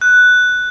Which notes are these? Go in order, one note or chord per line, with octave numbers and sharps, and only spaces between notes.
F#6